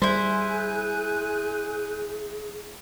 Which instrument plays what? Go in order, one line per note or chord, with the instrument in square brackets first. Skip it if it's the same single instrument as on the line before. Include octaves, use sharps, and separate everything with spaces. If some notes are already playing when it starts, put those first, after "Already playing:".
[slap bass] G3 [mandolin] E4 C5 [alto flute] G#4 [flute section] G#5 F#6 G6